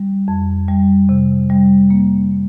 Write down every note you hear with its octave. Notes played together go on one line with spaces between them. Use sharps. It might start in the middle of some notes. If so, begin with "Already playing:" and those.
Already playing: G3
F2
G3
C3
G3
A#3